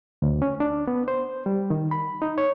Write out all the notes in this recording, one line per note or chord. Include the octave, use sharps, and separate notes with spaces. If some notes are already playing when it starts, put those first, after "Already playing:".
D2
C#4
D4
B3
C5
G3
D#3
B5
D#4
C#5